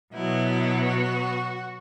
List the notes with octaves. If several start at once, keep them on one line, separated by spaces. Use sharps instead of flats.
B2 F#3 B3 E4
F#4